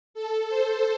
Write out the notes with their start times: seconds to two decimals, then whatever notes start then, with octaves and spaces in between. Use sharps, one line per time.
0.14 A4
0.49 C5